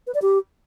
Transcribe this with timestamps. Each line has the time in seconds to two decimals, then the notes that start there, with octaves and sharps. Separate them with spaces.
0.07 B4
0.14 D5
0.22 G4